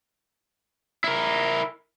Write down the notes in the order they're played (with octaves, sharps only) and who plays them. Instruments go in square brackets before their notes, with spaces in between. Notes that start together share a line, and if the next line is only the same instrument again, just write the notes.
[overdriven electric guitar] E4 A#4